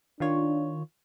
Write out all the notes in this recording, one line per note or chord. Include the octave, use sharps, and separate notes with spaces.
D#3 D4 F4 C#5